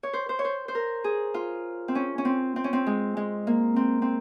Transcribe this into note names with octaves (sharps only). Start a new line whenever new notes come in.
C#5
C5
C5
C#5
C5
C5
A#4
G#4
F4
C4
C#4
C#4
C4
C4
C#4
C4
G#3
G#3
A#3
C4
C4